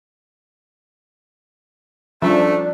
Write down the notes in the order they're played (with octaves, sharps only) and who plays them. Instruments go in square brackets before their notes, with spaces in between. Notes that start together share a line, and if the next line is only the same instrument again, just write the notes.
[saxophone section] G#2 A3 [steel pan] F3 [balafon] G3 C#4 [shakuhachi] D4